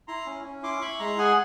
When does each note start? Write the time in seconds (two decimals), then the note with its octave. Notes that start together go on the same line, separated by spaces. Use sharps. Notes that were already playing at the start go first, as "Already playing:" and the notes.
0.08 E4 A#5 C6
0.26 C#4
0.44 C#4
0.63 E4 C6 D6
0.82 E4 B5 C#6
1.00 G#3 A#5 C6
1.18 G#4 F#5 G#5